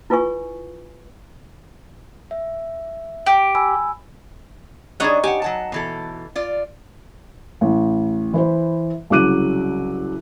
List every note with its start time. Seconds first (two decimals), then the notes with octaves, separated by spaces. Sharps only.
0.10 E4 F4 B4 G#5 C#6
2.31 E5
3.26 G4
3.55 G#5 B5 E6
5.00 G3 D4 D#4 G#4 C#5 F#5
5.24 G4 F#5 G#5
5.42 F#3 F#5 A5
5.72 B2 E3 A4
6.35 F4 D5
7.61 A1
8.33 E3 B4 C5
9.10 C2 C#3 F#3 D6 F#6 D#7